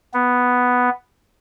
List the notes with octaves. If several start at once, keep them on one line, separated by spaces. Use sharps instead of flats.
B3